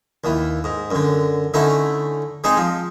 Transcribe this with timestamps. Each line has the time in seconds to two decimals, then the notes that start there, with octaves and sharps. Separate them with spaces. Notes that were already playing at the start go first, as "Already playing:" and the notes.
0.24 D#2 E3
0.64 G#2
0.91 F#2 D3
1.54 D3 A3 C#4 D#4 E4
2.44 G#3 C4 D#4 G#4
2.57 F3